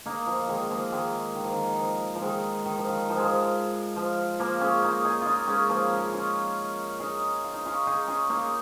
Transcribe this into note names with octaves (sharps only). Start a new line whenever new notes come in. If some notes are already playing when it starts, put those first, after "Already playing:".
A#3 D#4
F3
A#3
D#3 G#3
F3 A#3
D#3 G#3
D#3
F3
D#3
F3
F3
D#3 G#3
D#3
F3
D#3
F3
G#3
F3
F3
F3 A#3
G#3 C#4
A#3 D#4
D#4 G#4
A#3 D#4 F4
G#3 C#4
F3 A#3
G#3 C#4
C#4 F4
D#4 G#4
F4
D#4
C#4 F4
D#4 G#4
C#4 F4
A#3 D#4